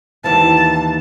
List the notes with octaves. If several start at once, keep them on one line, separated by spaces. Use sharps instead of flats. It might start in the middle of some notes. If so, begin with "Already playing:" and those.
D#2 E3 A5